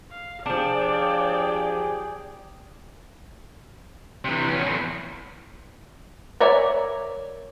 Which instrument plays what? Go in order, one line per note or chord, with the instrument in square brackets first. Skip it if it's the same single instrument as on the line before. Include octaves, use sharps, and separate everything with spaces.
[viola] F5
[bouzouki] F3 D4 [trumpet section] G4 G#4 [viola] D5 G5
[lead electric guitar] C3 E3
E2 C#4
E2 A2
[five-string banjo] A#4 C#5 D5 E5 G#5